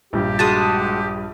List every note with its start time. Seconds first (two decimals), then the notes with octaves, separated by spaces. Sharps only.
0.13 A#1 G2 G4
0.39 G#3 F#4 A5 D#6